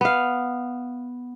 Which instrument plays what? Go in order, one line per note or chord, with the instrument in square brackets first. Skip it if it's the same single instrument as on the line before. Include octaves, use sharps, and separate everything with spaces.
[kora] B3 F5